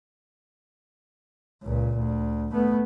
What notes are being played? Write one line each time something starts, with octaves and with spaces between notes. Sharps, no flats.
C#2 A#2
D2
A3 B3